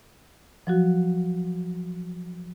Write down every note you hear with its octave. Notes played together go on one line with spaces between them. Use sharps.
F3 F#3 F#4